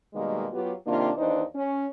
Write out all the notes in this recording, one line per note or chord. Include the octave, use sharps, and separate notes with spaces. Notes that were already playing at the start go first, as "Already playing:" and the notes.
B2 D#3 G3 G#3 A#3
F#3 B3 F4 G4
C3 D#3 A#3 D4 F4
D#2 E3 D4 D#4 C5
C#4